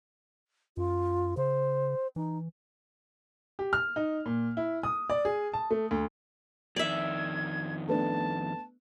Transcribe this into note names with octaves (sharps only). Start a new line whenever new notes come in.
F#2 F4
C#3 C5
E3 D#4
G4
F6
D#4
A#2
E4
D#6
D5
G#4
A5
A3
D2
F2 D#3 D5 E5 G#6
A3 B3 D4 A5